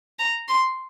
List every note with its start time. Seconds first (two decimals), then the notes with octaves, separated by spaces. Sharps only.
0.19 A#5
0.48 C6